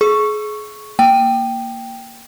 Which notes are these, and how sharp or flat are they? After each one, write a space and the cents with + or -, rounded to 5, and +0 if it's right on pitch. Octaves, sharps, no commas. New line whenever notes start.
G#4 +30 C#6 +0
A#3 +0 G5 +0